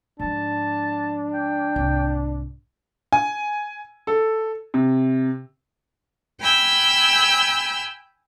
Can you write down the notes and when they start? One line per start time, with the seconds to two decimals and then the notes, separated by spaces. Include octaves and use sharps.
0.20 G#2 F3 D4 A5
1.33 G5
1.76 C2 G#2
3.13 G#5
4.07 A4
4.74 C3
6.40 G5 G#5 B5 E6 F6 G6